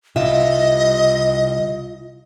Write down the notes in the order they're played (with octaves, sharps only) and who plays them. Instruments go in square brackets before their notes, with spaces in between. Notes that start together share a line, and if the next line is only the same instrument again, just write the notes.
[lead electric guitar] C2 [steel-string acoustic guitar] F4 E5 [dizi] D#5